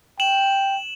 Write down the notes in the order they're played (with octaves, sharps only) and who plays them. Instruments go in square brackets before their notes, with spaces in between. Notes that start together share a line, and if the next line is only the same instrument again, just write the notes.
[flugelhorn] G5 [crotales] E7 F#7